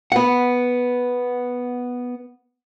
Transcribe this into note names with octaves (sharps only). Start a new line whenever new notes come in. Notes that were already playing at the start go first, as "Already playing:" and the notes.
B3 F#5